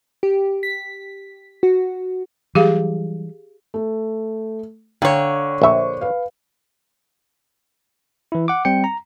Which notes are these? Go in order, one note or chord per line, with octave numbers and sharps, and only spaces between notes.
G4
B6
F#4
E3 F#3 G3 G4 G#4 F5
A3
D3 C#5 F5 G5 A#5
A#1 C5 E5 C#6
B4 F5
E3 E4
F#5 D6
G3 C4 G5 C#7
A#5